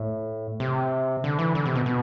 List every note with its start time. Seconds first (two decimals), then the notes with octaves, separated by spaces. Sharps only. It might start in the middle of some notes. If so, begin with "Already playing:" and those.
Already playing: A2
0.60 C3
1.24 D3
1.39 E3
1.55 D3
1.65 C3
1.75 B2
1.86 B2